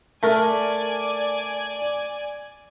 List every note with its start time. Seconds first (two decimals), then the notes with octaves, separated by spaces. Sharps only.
0.23 A3 A#4 D5 G#5